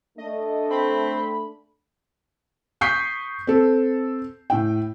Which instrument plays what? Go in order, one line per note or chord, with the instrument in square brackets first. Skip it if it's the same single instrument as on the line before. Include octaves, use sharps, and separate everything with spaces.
[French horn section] A3 D4 [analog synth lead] D#5
[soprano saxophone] C4 [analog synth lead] B5
[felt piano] C#6 D#6 G6 B6 C7
C4 A4
A2 G5